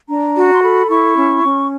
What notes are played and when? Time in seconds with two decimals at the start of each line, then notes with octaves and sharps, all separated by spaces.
0.08 D4 A#5
0.36 F#4
0.52 C6
0.62 A4 B5
0.89 E4 C#6
1.17 C#4
1.44 C#4